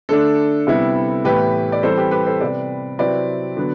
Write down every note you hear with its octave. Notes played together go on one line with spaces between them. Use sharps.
D3 A3 D4 A4
C3 G3 B3 E4
A2 E3 B3 G4 B4
D5
E3 G3 C4 E4 A4 C5
G4 B4
G4 B4
A4 C5
C3 G3 B3 B4 D5
C3 F#3 C4 E4 B4 D5
D3 F#3 B3